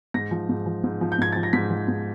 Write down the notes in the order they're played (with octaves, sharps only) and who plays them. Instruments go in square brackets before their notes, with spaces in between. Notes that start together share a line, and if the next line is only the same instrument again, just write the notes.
[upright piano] G#2 A#6
F3
G#2
F3
G#2
F3
G6
G#2 G#6
F3 A6
A#6
G#2 B6
F3
G#2